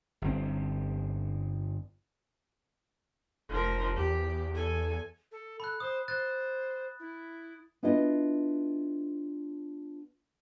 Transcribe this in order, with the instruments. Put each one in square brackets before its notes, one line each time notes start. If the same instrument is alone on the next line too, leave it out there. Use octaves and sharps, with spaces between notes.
[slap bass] G1 C4
[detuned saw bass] F1 [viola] F3 A#4
[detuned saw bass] E2 [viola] G4
[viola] A4 G#5
[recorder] A4
[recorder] A4 [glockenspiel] B5 F#6
[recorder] C5 [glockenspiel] D#6
[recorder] C5 [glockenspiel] F#6 A6
[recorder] E4
[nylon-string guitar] B3 D4 E4 F4 B4 D#5